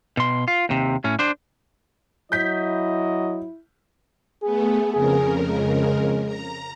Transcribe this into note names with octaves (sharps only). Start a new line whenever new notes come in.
B2 C6
F4
D#2 C3
A2 C#4
D4 C5
F#3 E4 D#5 G6 B6
A3 B3 G#4
F2 C#3 G#4 A#4
G#3
A#5